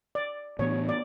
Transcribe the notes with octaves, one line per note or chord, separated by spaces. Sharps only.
D5
A2 E3 B3 D4 C#5
D5